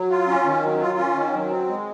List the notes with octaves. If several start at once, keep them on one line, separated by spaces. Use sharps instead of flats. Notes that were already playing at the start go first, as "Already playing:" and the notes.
Already playing: F#3
F4
C#4
D#3
F#3
F4
C#4
D#3
F#3
C4
G#3